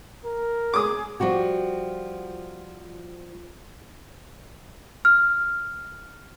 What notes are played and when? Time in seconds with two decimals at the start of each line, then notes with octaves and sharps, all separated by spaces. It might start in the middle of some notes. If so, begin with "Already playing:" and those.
0.24 A#4
0.74 G#4 D6 D#6
1.20 F3 G3 F#4 G4
5.05 F6